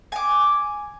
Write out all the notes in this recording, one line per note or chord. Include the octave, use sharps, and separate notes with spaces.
G#5 D6